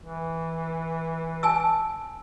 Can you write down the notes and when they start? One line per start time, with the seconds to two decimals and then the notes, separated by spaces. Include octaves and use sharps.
0.02 E3
1.43 G#5 A5 E6